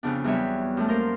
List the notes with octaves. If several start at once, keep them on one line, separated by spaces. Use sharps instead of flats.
F2 C#3 B3 D4
E2 F#3 G3 C#5 E5
F#2 A3
A#3 A#4 C5